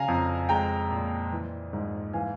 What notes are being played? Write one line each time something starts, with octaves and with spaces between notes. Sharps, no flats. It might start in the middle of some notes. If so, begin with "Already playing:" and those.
Already playing: C#3 F5 G#5 A#5
F2
G#3 G5 A#5
A#2
E3
G#2
E3 F5 G#5